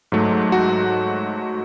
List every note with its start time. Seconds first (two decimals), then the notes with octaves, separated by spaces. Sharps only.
0.12 G#2 F#3 A3
0.52 F#4